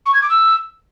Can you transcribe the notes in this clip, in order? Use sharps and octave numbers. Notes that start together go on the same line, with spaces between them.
C#6
G#6
D6
E6